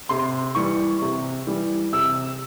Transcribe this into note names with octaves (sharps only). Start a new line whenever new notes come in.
C3 C6
E3 G3 C#6
C3
E3 G3
C3 E6